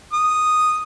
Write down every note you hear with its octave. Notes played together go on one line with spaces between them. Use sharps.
D#6